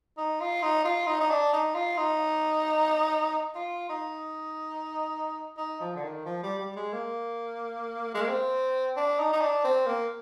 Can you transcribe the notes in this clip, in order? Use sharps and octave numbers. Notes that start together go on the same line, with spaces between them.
D#4
F4
D#4
F4
D#4
D#4
D4
D#4
F4
D#4
F4
D#4
D#4
F3
D3
D#3
F3
G3
G3
G#3
A#3
G#3
A#3
C4
D4
D#4
D#4
D4
C4
A#3